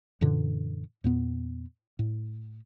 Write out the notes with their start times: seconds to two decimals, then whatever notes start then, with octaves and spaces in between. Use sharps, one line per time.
0.21 F#2 A#2 D3 E3
1.04 E2 A#2 B3
1.99 A2